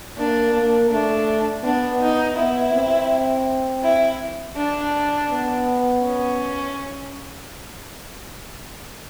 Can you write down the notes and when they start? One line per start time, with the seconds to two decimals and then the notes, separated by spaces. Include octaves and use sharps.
0.17 A#3 D4
0.54 A#3
0.91 A3 D4
1.64 B3 D4
2.01 D#4
2.37 B3 E4
2.74 C4
3.84 E4
4.57 D4
5.30 B3
6.03 C#4